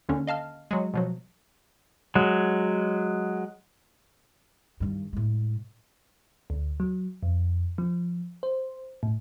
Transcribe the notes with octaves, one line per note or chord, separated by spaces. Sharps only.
D#2 D3 C#4
D#5 F5 A5 F6
F#3 G#3
B2 F3 F#3
F#3 G#3
G2 D#3
A2 G#3
D2
F#3
F2
F3
C5
A2